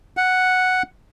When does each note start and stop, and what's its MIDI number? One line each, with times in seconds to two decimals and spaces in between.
0.17 0.83 78